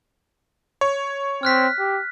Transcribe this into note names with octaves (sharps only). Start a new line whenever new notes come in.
C#5
C4 F6 F#6 B6
G4